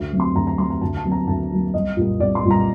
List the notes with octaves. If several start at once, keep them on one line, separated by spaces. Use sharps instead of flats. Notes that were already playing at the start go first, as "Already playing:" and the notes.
Already playing: D2
C3 F#3 A3
C6
D2 A#5
A#5
C3 F#3 A3 C6
A#5
D2 A5
A5
C3 F#3 A#3
A#5
D2 A5
C3 F#3 A#3
C2 D#5
A#2 G3 A#3
C2 D5
C6
A#2 G3 A#3
A#5